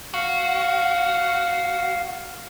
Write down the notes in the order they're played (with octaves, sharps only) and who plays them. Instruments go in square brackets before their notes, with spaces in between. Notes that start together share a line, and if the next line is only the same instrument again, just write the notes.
[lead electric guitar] F#4 [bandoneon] F5